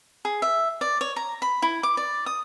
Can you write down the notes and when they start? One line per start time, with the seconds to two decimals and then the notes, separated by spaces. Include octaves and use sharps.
0.25 G#4
0.42 E5
0.81 D5
1.01 C#5
1.16 A#5
1.42 B5
1.62 E4
1.83 D6
1.97 D5
2.26 D#6